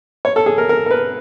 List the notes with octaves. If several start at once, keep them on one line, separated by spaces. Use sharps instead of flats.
C#5
A4
G#4
A#4
A#4
A#4
B4